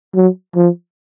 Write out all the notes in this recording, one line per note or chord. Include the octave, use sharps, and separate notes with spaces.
F#3
F3